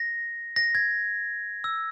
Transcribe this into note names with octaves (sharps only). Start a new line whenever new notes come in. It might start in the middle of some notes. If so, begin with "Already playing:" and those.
Already playing: A#6
A#6
G#6
E6